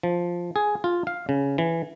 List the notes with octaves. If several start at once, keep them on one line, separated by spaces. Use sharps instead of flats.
F3
G#4
F4
F5
C#3
E3